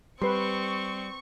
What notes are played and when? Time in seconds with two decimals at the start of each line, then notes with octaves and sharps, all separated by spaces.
0.22 G3 C4 B4 C6 C#6